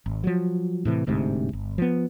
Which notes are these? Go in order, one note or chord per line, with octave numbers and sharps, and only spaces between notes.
G#1
F3 F#3
A2 C3 E3
D1 D2 G#2 C3
G1
F3 B3